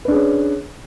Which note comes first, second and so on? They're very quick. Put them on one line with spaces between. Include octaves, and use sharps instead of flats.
B4 D4 G#4 C#4